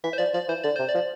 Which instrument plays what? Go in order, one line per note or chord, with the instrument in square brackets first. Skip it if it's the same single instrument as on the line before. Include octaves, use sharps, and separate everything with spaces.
[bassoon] E3 [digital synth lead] E5
[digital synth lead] C5
[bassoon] F3 [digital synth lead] D5
[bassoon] F3 [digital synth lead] D5
[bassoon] E3 [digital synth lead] C5
[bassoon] D3 [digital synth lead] D5
[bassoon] C3 [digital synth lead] C5
[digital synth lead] D5
[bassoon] F3